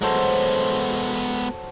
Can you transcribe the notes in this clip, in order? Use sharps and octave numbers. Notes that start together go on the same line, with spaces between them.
F#3 G#3 B3 A4 C5